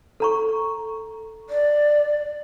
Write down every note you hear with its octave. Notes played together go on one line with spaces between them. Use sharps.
A4 A#5 C#6
D5